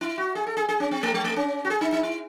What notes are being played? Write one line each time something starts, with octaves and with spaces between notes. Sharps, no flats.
E4
F#4
G#4
A4
G#4
G#4
C#4
C4
A3
G#3
A3
C#4
F#4
G#4
D#4
D#4
E4